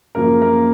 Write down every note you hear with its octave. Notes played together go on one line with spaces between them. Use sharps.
F#2 C#3 F3 A#3 A#4
A#3 A#4